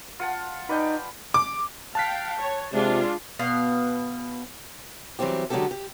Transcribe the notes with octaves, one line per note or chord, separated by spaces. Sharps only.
F4 F#5 A5
D#4 B4 D5 G5
D6
F5 G5 A5 F#6 B6
C#5
C3 G#3 D4 F4
B2 B3 F5
E3 F#3 G3 C4 G4
D3 F#3 G#3 C#4 G4 A4
G4